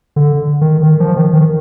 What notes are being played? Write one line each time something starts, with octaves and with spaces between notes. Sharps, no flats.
D3
D#3
D#3
F3
D#3
D#3